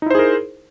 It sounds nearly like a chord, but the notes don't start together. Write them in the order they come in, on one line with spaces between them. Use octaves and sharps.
D#4 E4 C5 G#4 A#4